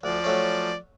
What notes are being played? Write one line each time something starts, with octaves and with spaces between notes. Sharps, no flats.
D2 F3 D5
F#3 A3 C#4